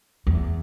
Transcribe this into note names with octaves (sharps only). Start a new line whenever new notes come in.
E2